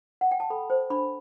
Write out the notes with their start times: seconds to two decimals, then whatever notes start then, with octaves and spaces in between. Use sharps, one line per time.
0.21 F#5
0.31 G5
0.40 A5
0.50 A4 B5
0.70 C5
0.90 D4 B5